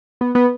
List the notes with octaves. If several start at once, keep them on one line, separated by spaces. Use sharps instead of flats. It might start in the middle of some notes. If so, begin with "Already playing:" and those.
B3
B3